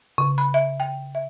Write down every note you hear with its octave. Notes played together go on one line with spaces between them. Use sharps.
C#3
B5
E5
G5
E5